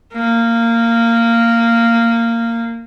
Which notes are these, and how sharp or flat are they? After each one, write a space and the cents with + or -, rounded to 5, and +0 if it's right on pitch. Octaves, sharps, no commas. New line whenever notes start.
A#3 -15